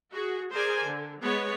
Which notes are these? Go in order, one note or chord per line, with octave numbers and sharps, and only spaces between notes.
F#4 G#4
G#4 A#4 C5 D5 G#5
D3
G#3 B3 C#5